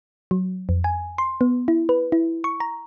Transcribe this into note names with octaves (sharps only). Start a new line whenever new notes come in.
F#3
F2
G#5
C6
B3
E4
B4
E4
C#6
A#5